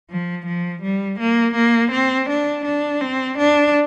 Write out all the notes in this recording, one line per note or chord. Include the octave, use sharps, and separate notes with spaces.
F3
F3
G3
A#3
A#3
C4
D4
D4
C4
D4